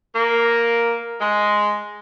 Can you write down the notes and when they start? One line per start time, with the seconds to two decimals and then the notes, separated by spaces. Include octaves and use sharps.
0.15 A#3
1.20 G#3